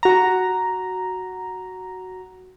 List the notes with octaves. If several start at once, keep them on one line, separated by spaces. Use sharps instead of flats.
F#4 A#5